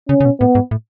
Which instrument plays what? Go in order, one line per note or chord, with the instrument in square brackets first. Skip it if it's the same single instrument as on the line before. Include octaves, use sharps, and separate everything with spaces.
[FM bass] C#3 [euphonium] C#4
[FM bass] C#3
B2
[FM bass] A2 [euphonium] B3
[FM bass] G#2
A2